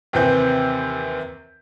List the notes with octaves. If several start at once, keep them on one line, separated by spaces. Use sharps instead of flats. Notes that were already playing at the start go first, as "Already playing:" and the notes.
D#2 C3 E3 C4 G6